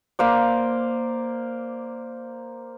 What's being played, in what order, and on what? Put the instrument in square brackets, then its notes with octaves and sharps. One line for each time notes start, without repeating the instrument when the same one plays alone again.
[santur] A#3 C5 D5